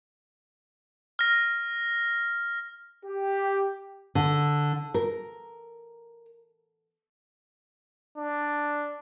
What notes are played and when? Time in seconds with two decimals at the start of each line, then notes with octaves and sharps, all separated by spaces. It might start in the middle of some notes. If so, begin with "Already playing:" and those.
1.19 F6 A#6
3.05 G4
4.15 D3
4.94 A#4
8.18 D4